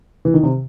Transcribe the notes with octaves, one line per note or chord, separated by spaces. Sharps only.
E3
D#3
C3